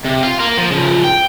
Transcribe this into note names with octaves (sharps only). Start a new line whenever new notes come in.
C3
F5 C6
A#4 F5
F3
C#3 F3
G5